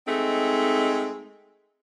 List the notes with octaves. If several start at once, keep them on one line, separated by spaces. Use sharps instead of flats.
G#3 A3 C4 D#4